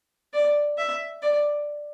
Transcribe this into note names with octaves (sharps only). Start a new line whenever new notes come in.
D5
E5
D5